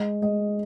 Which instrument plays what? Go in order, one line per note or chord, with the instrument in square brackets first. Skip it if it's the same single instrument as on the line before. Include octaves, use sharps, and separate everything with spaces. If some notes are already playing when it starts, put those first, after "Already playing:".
Already playing: [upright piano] G#3 D#5
G#3 D#5